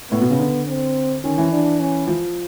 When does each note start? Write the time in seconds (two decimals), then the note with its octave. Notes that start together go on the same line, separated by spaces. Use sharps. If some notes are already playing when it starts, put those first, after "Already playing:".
0.11 A2 B3
0.21 B2
0.30 C#3
0.39 D3
0.68 C4
1.24 D#3 C#4
1.38 E3
1.52 D4
1.80 C#4
2.07 F3